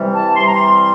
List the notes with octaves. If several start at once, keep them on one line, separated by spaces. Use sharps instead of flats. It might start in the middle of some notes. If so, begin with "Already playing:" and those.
Already playing: C3 E3 G3
A5
C3 E3 G3 C6
A#5
C6